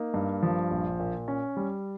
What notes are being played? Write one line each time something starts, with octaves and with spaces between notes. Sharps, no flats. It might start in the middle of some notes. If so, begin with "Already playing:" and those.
Already playing: A#3 D#4
G2
F3
A#1
A#2
C#4
G3